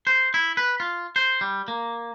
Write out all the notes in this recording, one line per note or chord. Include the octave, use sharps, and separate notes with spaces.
C5
E4
B4
F4
C5
G3
A#3